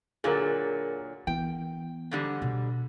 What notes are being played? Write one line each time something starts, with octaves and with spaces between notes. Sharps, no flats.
A#2 D3 F#3 G#4 A#4
E3 B3 G5
G#2 D3 G3
B2